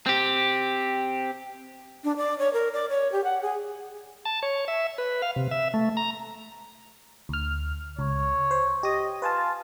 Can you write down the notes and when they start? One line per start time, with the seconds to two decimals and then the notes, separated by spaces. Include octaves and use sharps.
0.06 C4 G4
2.04 D4
2.17 D5
2.39 C#5
2.53 A#4
2.73 D5
2.89 C#5
3.12 G4
3.24 F#5
3.42 G#4
4.25 A5
4.43 C#5
4.68 E5
4.98 B4
5.22 F5
5.36 C3
5.51 E5
5.74 A3
5.97 A#5
7.29 D2 F6
7.99 C#2 C#5
8.51 C5
8.83 G4 D#5 D#6
9.22 F4 B4 G#5 A5